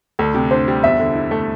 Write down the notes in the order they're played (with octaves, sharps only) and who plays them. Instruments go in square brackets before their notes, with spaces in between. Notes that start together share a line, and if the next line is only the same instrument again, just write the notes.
[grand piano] D2 [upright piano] A4
[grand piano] C3
[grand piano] D4 [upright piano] C5
[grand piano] G3
[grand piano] E2 [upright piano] E5
[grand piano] D3
E4
A3